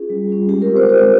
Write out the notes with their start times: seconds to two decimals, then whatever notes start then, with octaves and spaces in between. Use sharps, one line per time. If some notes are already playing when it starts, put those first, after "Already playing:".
Already playing: C#4 F4 G#4
0.10 G3
0.29 C#4 F4
0.49 G#3 G4
0.62 A#4
0.69 C4 F4
0.76 C5
0.89 G#3 C5